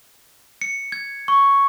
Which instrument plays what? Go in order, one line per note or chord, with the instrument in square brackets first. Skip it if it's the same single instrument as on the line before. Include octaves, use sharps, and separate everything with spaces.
[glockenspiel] C#7
G#6
C#6